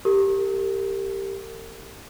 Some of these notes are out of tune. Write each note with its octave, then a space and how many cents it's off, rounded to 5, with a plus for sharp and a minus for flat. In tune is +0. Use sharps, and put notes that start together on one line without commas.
G4 +0 A#4 -40